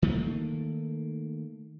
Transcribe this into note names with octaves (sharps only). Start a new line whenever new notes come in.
D#3 A3 A#3